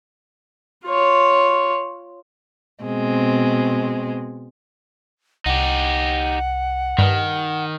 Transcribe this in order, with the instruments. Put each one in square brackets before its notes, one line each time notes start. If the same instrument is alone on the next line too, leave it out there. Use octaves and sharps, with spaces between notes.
[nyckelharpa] F4 C#5
[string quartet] B2 G#3 C4
[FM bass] C2 [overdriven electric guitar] D#4 G4 [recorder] F#5
[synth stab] G2 [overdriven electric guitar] D#3